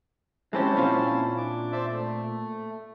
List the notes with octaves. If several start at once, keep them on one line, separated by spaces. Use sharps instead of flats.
G#3 C4 C#4 E4 G4 A5
A#2 C4 F5
D4 D6
C5 D5 E5
A3